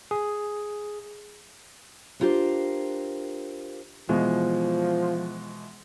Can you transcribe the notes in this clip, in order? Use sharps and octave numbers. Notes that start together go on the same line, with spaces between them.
G#4
B3 D4 F4 G4 A#4 C5
B2 E3 F3 G#3